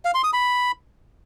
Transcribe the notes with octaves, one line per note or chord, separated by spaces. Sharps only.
F5
C6
D#6
B5